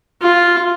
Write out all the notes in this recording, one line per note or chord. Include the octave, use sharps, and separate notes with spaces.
F4